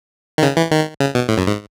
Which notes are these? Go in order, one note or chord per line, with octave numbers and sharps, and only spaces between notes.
D#3
C#3
E3
D#3
C#3
B2
A2
F#2
G#2